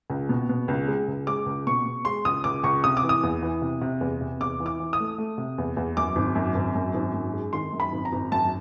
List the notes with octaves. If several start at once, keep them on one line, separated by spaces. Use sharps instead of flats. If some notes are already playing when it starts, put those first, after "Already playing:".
C#2
B2
B2
C#2
G#3
C#2
G#3 D6
C#2
B2 C#6
B2
G#3 C6
C#2 D#6
C#2 D6
C#2 C#6
C3 D#6
D6
E3
D#6
E2
E3
C3
C3
E2
C3
E2 D6
E3
D6
E3
D#6
A3
A3
C3
E2
E2
F#2 D6
G#1
F#2
G#1
F#2
G#1
F#2
G#3
D#3 C6
F#2
B5
G#1
A#5
G#1
F#2 A5